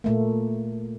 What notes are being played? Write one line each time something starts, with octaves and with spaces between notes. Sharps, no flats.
A#2 A3 A#3